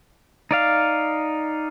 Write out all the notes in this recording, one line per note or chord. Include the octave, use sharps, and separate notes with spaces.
D#4 D5 F5